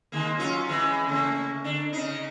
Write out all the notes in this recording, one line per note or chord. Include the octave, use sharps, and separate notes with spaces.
D#3 G#3 A#3
F#3 C#4 F4
E3 G#3
C#3 A3 A#3
D3 D4
C#3 D#4